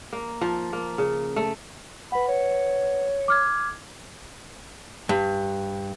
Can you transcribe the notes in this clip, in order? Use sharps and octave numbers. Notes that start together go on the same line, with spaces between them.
A#3
F3
A#3
C#3
A3
B4 F#5 B5
C#5
D6 F6 G#6
G2